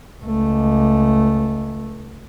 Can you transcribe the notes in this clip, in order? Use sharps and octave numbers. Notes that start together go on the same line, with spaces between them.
C#2 A3